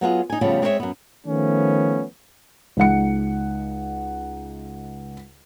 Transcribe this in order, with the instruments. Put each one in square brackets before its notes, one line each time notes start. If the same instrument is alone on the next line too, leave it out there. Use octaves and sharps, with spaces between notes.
[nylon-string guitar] F#3 B3 F4 G#4
D#4 G#5
F2 C#3 F3 G3 A3 B3
G#3 C4 G#4 A#4 C#5 E5
F#2 B3
[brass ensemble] D#3 F3 A3 B3 C#4
[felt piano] C#2 D#4 F#5 C#7